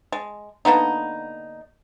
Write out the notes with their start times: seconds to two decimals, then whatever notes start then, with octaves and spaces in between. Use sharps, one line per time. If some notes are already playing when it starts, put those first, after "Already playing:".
0.12 G#3
0.65 D3 A#3 B3 D#4